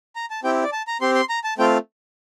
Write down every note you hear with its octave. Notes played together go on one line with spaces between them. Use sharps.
A#5
A5
C4 E4 G4 G5
D5
A5
A#5
C4 G4 C6
C6
A#5
A5
A3 C4 F4 G5